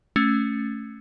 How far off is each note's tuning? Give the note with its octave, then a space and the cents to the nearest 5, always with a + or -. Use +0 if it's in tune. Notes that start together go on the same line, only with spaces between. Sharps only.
A3 +0 C#4 +0